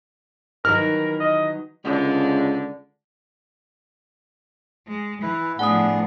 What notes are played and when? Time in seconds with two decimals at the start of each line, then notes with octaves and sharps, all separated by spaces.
0.65 D#3 E3 F#3 A#4 F6
1.20 D#5
1.85 C#2 D3
4.88 G#3
5.22 E3 E4 B4
5.59 A2 F3 B3 D4 G#4 F#5 D#6